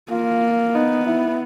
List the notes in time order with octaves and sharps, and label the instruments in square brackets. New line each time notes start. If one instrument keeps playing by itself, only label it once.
[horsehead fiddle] A#3 [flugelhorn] F4
[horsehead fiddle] B3 [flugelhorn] D#4
[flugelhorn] E4